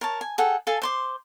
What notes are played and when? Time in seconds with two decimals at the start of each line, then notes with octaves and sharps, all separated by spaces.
0.01 A#4 C#5 A5
0.21 G#5
0.38 G#4 A4 F#5 G5
0.67 A4 F5 G#5 A5
0.82 C5 C6 D6